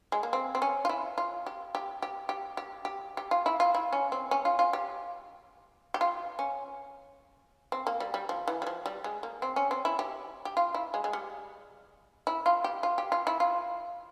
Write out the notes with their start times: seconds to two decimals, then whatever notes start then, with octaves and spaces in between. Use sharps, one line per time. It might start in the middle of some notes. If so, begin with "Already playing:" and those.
0.12 G#3
0.23 A#3
0.33 C4
0.55 C4
0.62 C#4
0.85 F4
0.89 E4
1.18 F4
1.46 G4
1.75 G4
2.02 G4
2.29 G4
2.57 G4
2.85 G4
3.17 G4
3.31 F4
3.46 E4
3.60 F4
3.75 E4
3.93 C#4
4.12 C4
4.31 C#4
4.45 F4
4.59 F4
4.73 G4
5.94 G4
6.01 F4
6.39 C#4
7.72 C4
7.87 A#3
8.00 G3
8.14 G3
8.29 F3
8.48 E3
8.62 G3
8.67 F3
8.86 G3
9.04 G#3
9.23 A#3
9.42 C4
9.56 C#4
9.71 C4
9.85 E4
9.99 G4
10.45 G4
10.57 F4
10.74 E4
10.94 G#3
11.04 G#3
11.13 G3
12.27 E4
12.46 F4
12.64 G4
12.83 F4
12.98 G4
13.12 F4
13.27 E4
13.40 F4